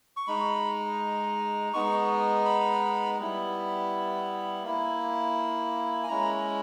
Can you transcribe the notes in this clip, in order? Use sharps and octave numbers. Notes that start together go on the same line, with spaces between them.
C#6
G#3 D#4 B5
G#3 B3 D#4 C#6
B5
G3 B3 E4
A#3 E4
G#5
G#3 C#4 E4 A#5